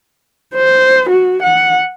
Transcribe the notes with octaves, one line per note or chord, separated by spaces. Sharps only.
C5
F#4
F#5